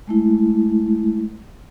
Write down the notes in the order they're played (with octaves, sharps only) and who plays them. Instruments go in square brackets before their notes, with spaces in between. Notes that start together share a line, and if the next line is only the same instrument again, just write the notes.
[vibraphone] G#3 A3 E4